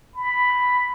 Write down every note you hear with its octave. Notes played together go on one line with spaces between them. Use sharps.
B5